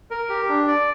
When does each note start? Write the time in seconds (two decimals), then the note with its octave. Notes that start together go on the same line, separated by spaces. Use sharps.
0.11 A#4
0.29 G4
0.49 D4
0.68 D5